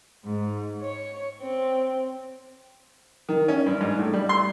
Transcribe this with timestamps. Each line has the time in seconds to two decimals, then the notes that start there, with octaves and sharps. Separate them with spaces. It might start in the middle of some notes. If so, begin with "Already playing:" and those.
0.24 G#2
0.82 C#5
1.42 C4
3.29 D#3
3.48 C#4
3.66 G2
3.81 G#2
3.99 A2
4.14 G3
4.29 C6